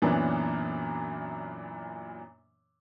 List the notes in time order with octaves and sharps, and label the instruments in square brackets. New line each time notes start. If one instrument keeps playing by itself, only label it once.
[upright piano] F#2 A#2 E3 B3 C#4 D4